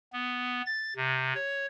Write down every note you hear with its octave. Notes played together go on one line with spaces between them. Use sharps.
B3
A6
C3
C#5